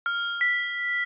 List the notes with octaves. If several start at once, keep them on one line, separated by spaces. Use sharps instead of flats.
F6
B6